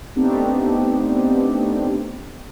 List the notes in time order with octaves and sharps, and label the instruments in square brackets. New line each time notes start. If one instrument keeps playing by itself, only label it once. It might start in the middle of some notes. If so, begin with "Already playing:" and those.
[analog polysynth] A3 B3 C4 D4 D#4 G4